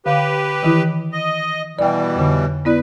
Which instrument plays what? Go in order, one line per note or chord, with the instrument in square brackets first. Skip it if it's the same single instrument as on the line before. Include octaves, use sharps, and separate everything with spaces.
[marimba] D3 F5 [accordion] G4 B4
[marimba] D#3 E3 E4
[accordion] D#5
[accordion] B2 E3 G3 [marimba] D5 G5
[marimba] F2 D3
[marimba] B3 E4 D5 [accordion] B4